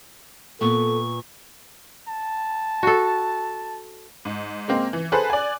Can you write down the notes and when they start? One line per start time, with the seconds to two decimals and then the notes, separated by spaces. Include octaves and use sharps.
0.61 A#2 B3 A4 C#6
2.08 A5
2.83 F#4 A4
4.25 G#2
4.68 G#3 A#3 C4
4.93 E3
5.12 G#4 A4 B4 C5 F#6
5.30 D5 G#5